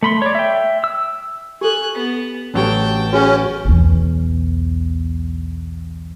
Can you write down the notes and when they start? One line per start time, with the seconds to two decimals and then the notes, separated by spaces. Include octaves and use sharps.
0.03 A3 B5 C6
0.22 C#5 D5
0.35 E5 G5
0.84 E6
1.61 G4 A4 G#5 F#6
1.95 B3
2.54 A1 F#3 C#4 G4 C#5 G5 A5
3.13 C#4 F#4 G#4 F#5
3.65 B1 E2